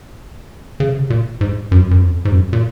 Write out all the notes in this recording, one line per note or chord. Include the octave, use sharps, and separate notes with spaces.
C#3
C3
C#3
A#2
G#2
F#2
F#2
F2
G#2
F#2
A#2